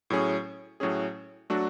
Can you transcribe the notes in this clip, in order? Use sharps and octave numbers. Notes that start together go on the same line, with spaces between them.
A2 F#3 C#4 G#4
A2 F#3 C#4 G#4
F#3 A3 D4 F#4